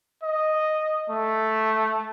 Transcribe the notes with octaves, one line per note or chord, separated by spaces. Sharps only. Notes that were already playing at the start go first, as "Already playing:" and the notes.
D#5
A3